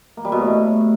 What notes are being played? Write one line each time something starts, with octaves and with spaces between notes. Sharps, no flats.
A#3
G3
B2
A2
A3